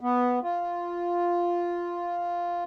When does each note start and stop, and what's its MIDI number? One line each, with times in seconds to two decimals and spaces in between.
0.01 0.39 59
0.43 2.64 65